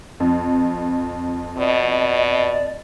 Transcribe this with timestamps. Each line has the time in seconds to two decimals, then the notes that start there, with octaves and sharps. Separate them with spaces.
0.20 F2
1.58 B2 D5 D#5